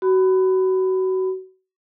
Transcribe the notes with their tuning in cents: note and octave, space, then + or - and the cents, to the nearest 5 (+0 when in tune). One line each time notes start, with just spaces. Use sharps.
F#4 +25 B5 +20